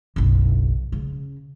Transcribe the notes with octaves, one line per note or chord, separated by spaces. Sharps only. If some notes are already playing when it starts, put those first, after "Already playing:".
F#1 B1
C#3